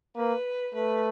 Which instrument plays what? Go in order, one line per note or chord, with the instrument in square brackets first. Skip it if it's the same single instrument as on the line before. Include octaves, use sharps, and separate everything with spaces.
[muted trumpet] A#3 [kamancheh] B4
[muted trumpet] A3 [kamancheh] B4